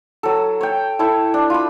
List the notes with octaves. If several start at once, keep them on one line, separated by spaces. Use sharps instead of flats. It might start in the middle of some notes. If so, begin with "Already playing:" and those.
F#3 A4
C#5 G5
E4 A4 C#5 A5
D4
F4 B5